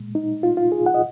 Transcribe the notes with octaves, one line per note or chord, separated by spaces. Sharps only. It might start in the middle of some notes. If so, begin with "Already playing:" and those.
Already playing: A#2 G#3
D#4
F4
F4
G#4
F#5
D#5